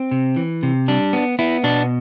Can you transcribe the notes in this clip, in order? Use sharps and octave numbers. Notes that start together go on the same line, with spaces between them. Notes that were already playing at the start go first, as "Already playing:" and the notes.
Already playing: C4
C3
E3
C3
G3 D4
B3
B3 E4
B2 D4